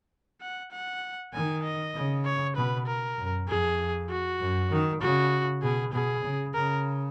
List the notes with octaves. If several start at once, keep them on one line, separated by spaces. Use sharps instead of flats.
F#5
F#5
D#3 G#5
D#5
C#3
C#5
B2 B4
A#4
F#2
F2 G#4
F#4
F#2
D#3
C#3 F#4
B2 G#4
B2 G#4
C#3
C#3 A#4